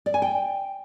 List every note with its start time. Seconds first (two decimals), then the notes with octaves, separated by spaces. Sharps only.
0.06 D5
0.14 G#5
0.22 G5